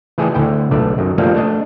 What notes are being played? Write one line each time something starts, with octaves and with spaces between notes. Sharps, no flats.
E3 A3 G#4 A4 D5 G5
D2 D3 E4 G5
B1 D3 A3 D5
F#2 D#3
F3 G3 A3 A#3 D4
A3 D4 D#5